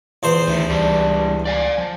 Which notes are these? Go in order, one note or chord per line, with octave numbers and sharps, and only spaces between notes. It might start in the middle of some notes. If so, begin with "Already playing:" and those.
E2 C5 C6
D2 D#3 A3
C#2 E3 G3 D4
D5 F5 G#5
F3